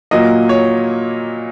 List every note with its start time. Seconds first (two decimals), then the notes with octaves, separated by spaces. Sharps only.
0.11 A#2 F#3 A#3 D#5
0.49 C#5